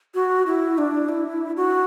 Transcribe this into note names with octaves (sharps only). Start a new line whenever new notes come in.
F#4
E4
D4
E4
F#4